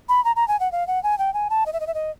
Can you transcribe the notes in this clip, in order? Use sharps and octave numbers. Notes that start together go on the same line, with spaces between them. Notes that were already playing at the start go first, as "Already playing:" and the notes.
B5
A#5
A#5
G#5
F#5
F5
F#5
G#5
G5
G#5
A5
D#5
E5
D#5
E5
D#5